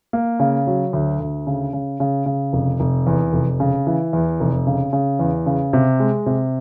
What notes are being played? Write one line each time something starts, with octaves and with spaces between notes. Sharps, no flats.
A#3
C#3
F#3
D2
D2
C#3
C#3
C#3
C#3
F1
F1
E2
F1
C#3
E3
E2
F1
C#3
C#3
E2
C#3
C3
G#3
C3